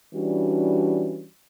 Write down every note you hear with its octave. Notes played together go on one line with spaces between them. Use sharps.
E3 G3 C#4 D4 F#4